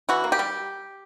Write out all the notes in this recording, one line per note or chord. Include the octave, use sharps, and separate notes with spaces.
E3 F#4
A#3
G4
G3